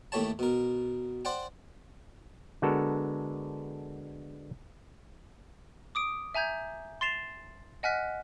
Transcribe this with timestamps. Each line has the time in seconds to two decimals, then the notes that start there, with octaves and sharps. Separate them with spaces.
0.12 D#2 A2 A3 G4 C#5 A5
0.39 B2 A#4
1.25 C5 D5 F#5 G5
2.62 D3 G#3 B3 F#4 A4 A#4
5.95 D6 D#6 D7
6.34 E5 G#5 A#5 G6 G#6
7.01 C6 A6 C7 E7 F7
7.83 D#5 F#5 G#5 F6 F#6 B6